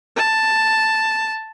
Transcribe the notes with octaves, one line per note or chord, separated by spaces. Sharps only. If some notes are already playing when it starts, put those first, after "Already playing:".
A5